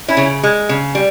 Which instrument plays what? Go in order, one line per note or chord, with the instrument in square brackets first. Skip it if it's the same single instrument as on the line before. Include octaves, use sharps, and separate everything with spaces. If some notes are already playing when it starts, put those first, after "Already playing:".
[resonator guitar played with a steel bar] C#4 E4
C#3
G#3
C#3
G3